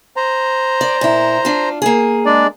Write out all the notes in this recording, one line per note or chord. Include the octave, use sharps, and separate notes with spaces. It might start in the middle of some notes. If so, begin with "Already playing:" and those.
C5 A#5
D5
A#2 E4
D4 F4
A#3 G#4
G#3 D4 D5